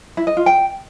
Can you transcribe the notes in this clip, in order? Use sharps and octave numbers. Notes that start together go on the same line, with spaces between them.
E4
D#5
F4
G5